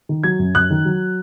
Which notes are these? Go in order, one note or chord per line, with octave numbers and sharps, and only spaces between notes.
D#3
F#3 G#6
F#2
F#2 F#6
D#3
F#3